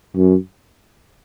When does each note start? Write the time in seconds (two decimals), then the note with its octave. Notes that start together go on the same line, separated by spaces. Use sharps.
0.16 F#2